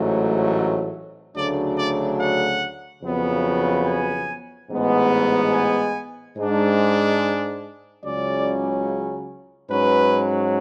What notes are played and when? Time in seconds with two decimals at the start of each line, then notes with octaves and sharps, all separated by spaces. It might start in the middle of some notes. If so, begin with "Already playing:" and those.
Already playing: A1 G#2 F#3 A3
1.35 D2 C#3 F#3 A3 D4 D5
1.77 D5
2.19 F#5
3.02 F2 C#3 F#3 B3
3.85 G#5
4.69 A1 G#2 G#3 B3
5.53 G#5
6.36 G#2 G#3 D4
8.03 C#2 C#3 F#3 C#4 D5
9.70 G#2 F#3 C#4 B4